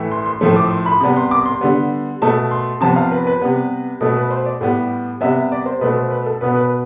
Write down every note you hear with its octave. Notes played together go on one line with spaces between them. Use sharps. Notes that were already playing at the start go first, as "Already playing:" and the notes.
Already playing: A2 E3 A3
C6
C6
A2 F3 A3
D6
C6
B5
C3 G3 B3
C6
D6
C6
D3 G3 B3
B2 A3 A5
C6
C3 F3 B3 A5
F5
B4
B4
C3 G3 B3
B2 A3 A4
B4
C5
D5
A2 G3 B3
C3 G3 B3 E5
D5
C5
B2 A3 B4
C5
B4
A4
B2 B3 B4
B4